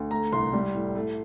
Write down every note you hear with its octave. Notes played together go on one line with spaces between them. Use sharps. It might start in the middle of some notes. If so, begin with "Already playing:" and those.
Already playing: D2
A3 A#5
C2 C6
G3
A2
A3